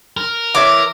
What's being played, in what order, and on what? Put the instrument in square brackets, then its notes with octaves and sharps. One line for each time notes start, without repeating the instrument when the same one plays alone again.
[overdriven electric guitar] A#4
[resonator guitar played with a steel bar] E3 C#5 E5 [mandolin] D6